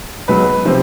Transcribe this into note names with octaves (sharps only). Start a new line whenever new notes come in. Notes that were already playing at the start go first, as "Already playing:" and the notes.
C#2 B2 F#3 B4
C3 F3 C5